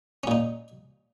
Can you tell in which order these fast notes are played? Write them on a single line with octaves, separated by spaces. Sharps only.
C#4 A#2 D#4